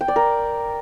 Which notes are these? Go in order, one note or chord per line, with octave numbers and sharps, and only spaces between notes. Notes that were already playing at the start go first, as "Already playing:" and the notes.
G5
D5
A#4